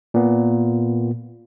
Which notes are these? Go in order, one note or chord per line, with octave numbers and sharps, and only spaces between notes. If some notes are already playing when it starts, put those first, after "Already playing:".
A#2 B3